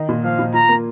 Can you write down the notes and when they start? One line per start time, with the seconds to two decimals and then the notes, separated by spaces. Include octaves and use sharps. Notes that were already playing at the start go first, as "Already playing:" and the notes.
Already playing: D#3 D#4
0.09 A#2
0.24 F3 F5
0.39 A#2
0.54 F4 A#5
0.69 A#3